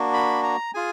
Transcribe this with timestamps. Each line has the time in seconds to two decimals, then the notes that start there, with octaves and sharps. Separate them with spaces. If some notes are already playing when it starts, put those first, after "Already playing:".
Already playing: A#3 D4 F#4
0.13 B5
0.43 A#5
0.74 F4 G#4 G#5